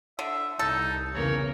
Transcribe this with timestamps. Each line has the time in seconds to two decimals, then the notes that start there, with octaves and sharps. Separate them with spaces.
0.19 D3 E5
0.59 C2 D#4 A4
1.14 E2 C#3 A#3 C#5